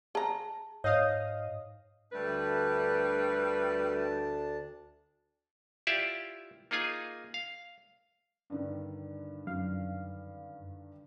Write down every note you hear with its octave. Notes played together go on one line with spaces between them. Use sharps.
G#4 A5 A#5
G#2 C#5 D#5 F5 D#6
D2 G3 A3 D4 B4 A5
E4 F4 G4 D5 E5 F5
A#3 D#4 F4 G#4 G#5
F5
G2 D3 D#3
F#2 F5